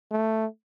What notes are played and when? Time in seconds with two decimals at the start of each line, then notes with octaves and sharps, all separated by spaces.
0.11 A3